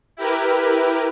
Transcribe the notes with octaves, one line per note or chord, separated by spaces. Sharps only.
E4 G4 A#4 B4